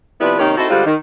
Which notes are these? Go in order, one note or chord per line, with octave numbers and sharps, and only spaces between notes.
C3 F3 G3 B3 E4 B4
C3 D#3 A#3 C#4 D#4 G4
C4 D#4 E4 F#4 A4
D3 G3 G#3 C4 F4 F#4
D#3